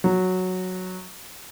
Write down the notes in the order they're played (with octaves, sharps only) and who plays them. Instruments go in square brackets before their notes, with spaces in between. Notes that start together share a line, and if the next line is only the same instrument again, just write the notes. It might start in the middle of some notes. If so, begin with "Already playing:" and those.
[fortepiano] F#3